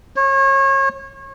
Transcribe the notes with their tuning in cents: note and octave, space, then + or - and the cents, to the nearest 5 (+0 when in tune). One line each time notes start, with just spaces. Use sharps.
C#5 -30